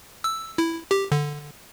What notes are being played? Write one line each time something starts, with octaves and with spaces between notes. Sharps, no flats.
E6
E4
G4
D3